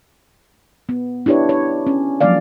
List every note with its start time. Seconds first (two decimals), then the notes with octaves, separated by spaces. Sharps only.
0.89 B3
1.26 D4 E4 G4 B4 C#5
1.49 C#5
1.87 C#4
2.21 F3 F#3 G#3 A#3 D5 F5